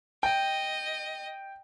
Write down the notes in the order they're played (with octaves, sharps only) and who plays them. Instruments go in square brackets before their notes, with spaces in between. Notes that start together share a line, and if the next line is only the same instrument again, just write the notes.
[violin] D#5 [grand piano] G5